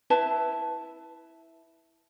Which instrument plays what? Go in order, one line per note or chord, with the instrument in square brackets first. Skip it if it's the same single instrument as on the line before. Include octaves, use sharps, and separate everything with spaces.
[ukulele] E4 B4 E5 A5